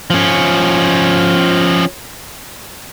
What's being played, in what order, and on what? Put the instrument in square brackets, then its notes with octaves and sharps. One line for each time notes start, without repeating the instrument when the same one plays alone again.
[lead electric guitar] F3 C#4